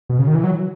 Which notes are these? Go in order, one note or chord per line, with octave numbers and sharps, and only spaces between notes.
B2
C#3
D#3
E3
F#3